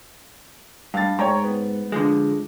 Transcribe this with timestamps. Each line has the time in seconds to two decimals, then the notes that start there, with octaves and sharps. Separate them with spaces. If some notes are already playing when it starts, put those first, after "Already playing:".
0.94 G2 F5 A6
1.19 G#2 C#5 G5 A#5
1.44 B3
1.92 D3 F3 G#3